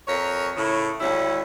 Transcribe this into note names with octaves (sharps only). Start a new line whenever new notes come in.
F2 A#4 C#5
A2 C#3
D2 G3 C#4 E4